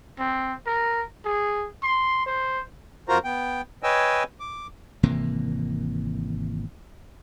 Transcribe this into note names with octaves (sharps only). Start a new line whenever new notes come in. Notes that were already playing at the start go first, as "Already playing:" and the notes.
C4
A#4
G#4
C6
C5
F2 F4 F#4 A#4 C5 A#5
B3 G5
B4 C#5 D#5 G5 G#5 E6
D6
G#1 C3 E3 A#3